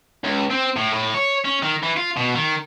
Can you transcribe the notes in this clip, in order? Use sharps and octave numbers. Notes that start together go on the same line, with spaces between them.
C#2
C4
A2
A2
C#5
C#4
D#3
E3
F4
B2
D#3